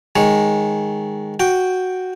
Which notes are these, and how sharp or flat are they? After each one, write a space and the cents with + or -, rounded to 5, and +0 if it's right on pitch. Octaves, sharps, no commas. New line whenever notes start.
D#3 +0 G#3 +0 C#5 -5
F#4 +0 G5 +0